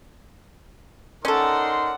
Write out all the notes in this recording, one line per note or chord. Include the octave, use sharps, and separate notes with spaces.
C#4 D#4 A4 A#4 D5 F#5 C6